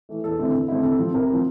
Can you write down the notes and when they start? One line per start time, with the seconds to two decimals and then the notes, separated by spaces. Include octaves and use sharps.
0.09 E3 A3
0.24 E2 A4
0.39 D3 A3 C4 E4
0.54 E2
0.68 D3 A3 C4 E4
0.83 C3 A4
0.99 F3 C4
1.14 C3 A#4
1.29 F3 C4